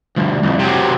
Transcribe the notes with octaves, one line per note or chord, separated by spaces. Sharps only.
D2 G2
C2 F2
C3 F#3